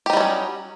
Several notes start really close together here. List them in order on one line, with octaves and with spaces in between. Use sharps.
G4 D#4 G3 F#3 C#4